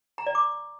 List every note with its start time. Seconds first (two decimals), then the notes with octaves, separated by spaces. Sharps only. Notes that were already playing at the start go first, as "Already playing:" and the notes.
0.18 A#5
0.26 D5
0.35 D6